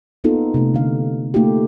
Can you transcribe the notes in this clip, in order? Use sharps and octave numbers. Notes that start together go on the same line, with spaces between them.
A#3 B3 D#4 F4 A4
C3 A3
D3 F5
A3 A#3 D#4 F4 G4